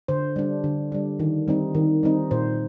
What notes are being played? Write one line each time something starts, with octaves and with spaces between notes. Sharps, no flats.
D3 C5
G3 D4
D3
G3 D4
D#3
G3 C4 D#4
D#3
G3 C4 D#4
A#2 C5